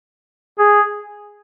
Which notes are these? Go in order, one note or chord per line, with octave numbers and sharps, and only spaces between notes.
G#4